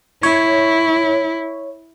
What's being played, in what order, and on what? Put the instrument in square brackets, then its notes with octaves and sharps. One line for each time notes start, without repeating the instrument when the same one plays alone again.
[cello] E4 [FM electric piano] C#5